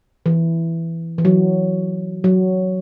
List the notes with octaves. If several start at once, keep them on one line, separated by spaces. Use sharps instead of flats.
E3
E3
F#3
F#3